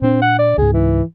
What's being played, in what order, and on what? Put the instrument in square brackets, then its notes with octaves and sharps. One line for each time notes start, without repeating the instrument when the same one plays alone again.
[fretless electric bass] A#2 D4 [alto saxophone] C4
[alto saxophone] F#5
D5
[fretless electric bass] C#2 G#2 [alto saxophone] G#4
[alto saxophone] E3